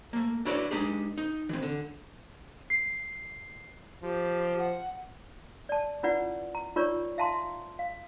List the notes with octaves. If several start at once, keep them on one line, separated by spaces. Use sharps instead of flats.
A3 A#3
D4 E4 F#4 B4 C#5 D5
G#3 D4 D#4 G4 G#4
D#4
E3 C4
D3
C7
F3 G4
F#5
D5 A5
C#4 E4 F4 B4 D5 F#5
A#5
D#4 F4 A#4 C#5 D5 C#6
E5 F5 A5 A#5 C6
F5